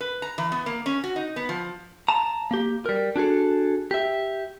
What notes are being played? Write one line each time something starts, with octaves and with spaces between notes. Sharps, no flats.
B4
A#5
E3
B3
A#3
C#4
F#4
D#4
B3
F3
A5 A#5
A#3 G4
G3 A#4
D4 F#4 G#4 A4
G4 E5